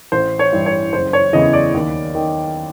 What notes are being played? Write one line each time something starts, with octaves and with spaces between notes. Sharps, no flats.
A1 C5
C#5
G2 E3
C#5
F#1 C5
C#5
E2 C#3 E3 D#5
D5
D#2
D#3